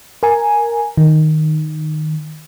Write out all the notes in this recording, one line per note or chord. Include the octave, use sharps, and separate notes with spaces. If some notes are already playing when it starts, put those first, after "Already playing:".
A#4 G#5
D#3